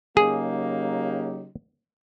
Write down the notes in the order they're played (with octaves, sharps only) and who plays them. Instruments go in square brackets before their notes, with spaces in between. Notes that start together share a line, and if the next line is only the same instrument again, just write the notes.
[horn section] C#3 F#3 A#3 D#4 G4 [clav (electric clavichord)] G#4